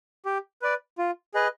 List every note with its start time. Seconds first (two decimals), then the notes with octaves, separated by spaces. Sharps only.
0.25 G4
0.62 B4 D5
0.98 F4
1.34 G#4 B4 D#5